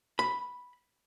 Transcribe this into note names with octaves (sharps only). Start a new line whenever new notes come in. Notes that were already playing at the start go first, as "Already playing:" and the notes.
B5